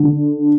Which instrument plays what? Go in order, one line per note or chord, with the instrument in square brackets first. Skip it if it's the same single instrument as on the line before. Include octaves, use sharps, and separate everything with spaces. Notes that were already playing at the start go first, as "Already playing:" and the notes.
Already playing: [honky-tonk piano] D3